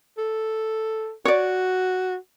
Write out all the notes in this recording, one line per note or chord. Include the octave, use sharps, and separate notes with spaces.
A4
F#4 C#5 D5